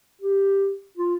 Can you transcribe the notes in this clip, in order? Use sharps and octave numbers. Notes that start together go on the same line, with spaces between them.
G4
F4